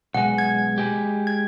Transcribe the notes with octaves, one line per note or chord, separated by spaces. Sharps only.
B1 G#3 F#5
G#6
G#3 G4
G#6